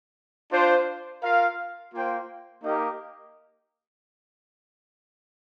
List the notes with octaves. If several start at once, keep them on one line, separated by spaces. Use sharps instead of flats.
D4 F4 C5
F4 A#4 F5
A#3 F4 C5 G5
A#3 D#4 G4 A#4 D#5